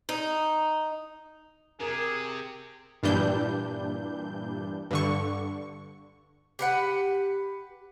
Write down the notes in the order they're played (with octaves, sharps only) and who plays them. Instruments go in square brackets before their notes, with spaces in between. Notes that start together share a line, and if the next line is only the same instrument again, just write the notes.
[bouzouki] D#4
[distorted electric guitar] C3 [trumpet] G#4 [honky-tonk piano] A#4
[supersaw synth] G2 A#2 E3 G3 D4 G6
G2 D3 C#6
[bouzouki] G4 B4 F#5